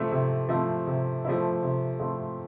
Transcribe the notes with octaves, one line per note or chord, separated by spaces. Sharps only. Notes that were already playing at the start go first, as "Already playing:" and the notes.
Already playing: C3 F3 A3 C4 E4
C3
F3 A3 C4 E4
C3
F3 A3 C4 E4
C3
F3 A3 C4 E4